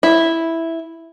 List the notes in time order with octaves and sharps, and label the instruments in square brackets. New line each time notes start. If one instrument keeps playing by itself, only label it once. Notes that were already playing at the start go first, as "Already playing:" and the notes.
[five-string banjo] E4